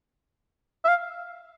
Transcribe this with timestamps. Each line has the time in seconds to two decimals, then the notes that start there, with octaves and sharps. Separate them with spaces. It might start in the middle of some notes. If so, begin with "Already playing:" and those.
0.85 E5
0.88 F5